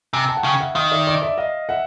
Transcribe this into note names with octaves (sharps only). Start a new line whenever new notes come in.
C3 G#5 A#5
G5 A5
F#5
C#3 F5 G5
E5 F#5
D#3 D#5 F5
D5 E5
D5 E5
D5 E5
D#5 F5
E5 F#5